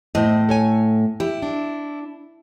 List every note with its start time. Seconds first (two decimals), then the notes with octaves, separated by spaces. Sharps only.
0.15 A2 A3 C5 D#5
0.49 A4 C#5 G#5
1.20 E4 G4
1.42 D4